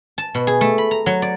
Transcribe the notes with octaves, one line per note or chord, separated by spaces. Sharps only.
A5
B2
G#4
A3
B5
A#5
F#3
D5